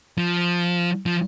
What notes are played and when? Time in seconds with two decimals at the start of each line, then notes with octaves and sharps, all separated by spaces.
0.18 F3
1.06 F3